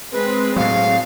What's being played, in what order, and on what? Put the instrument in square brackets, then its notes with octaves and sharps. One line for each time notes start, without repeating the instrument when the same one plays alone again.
[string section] G#3 [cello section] C4 [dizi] B4
[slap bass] A2 F#3 [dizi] F5